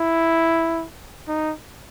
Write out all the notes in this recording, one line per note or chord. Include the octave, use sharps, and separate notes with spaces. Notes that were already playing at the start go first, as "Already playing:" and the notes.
Already playing: E4
D#4